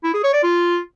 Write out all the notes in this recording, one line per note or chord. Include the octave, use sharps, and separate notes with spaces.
E4
G#4
C#5
D5
F4